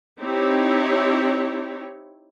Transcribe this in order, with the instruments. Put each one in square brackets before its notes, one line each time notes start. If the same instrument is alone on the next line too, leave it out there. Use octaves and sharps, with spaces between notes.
[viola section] C4 D#4 E4 G4 C#5